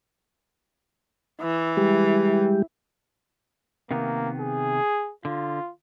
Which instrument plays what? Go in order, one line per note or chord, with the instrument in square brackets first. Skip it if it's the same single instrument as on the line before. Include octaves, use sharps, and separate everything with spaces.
[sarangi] E3
[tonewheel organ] G3 G#3 G4
[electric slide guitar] C3 D#3 B3 [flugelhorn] A#3
[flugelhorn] G#4
[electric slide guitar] D3 [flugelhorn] F4